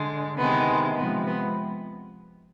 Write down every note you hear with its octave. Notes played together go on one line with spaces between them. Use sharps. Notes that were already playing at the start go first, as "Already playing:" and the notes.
Already playing: D3 G#3
C3 D#3 G#3 B3
C3 F3 G#3 B3
B3